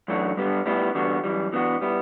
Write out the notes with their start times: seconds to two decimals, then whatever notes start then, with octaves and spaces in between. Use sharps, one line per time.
0.08 F#2 E3 A3 D4 F#4
0.37 G2 D3 G3 B3
0.66 A2 G3 B3 E4
0.95 E2 D3 G3 B3 F#4
1.24 F#2 E3 G3
1.53 E3 B3 D4 F#4
1.81 G3 B3 E4